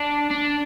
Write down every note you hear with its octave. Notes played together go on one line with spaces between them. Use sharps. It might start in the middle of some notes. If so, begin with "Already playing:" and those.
Already playing: D4
D4